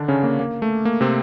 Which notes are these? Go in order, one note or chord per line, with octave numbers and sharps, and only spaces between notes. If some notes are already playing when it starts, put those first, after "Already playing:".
Already playing: D3 D#3 D4 D#4
C#3 C#4
A#3
A#3
A3
A#3
C3 C4